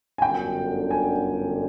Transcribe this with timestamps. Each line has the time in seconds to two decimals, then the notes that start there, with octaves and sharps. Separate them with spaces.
0.18 G#5
0.22 G1 F#2 D3 G5
0.91 G#5